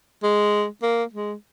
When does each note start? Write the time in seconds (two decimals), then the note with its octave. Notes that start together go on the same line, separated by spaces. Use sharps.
0.23 G#3
0.82 A#3
1.13 G#3